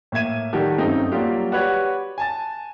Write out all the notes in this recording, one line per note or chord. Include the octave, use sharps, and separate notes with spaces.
A2 A#3 E5 G#6 D#7
D#3 G3 F#4 G4 A4
G1 F#2 A3 C4 D#4 G5
F#3 G3 A#3 F4 G4
F#4 G4 B4 C#5 D5
G#5 A5 A6